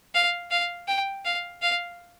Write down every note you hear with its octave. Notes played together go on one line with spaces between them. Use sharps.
F5
F5
G5
F5
F5